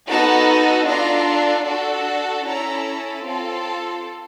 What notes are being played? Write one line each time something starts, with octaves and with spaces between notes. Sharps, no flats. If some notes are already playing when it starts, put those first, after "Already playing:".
B3 D#4 F#4 A4 A5
D4 F4 A4 A#5
D4 F#4 A4
C#4 E4 A4 A#5
C4 F4 A4